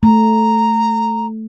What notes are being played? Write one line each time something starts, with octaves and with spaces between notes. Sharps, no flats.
A3 A#5